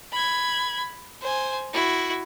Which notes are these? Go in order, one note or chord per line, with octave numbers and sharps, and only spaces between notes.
B5 G#6
C5 G#5
E4 F#4